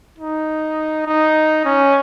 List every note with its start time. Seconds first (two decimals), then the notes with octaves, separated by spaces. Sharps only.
0.19 D#4
1.07 D#4
1.65 C#4